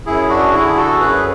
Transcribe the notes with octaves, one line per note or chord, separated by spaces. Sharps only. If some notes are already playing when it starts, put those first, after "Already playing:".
F#2 E4 G#4
D4 F#4
D3 E4 G#4
F#4 A4
F#2 G#4 B4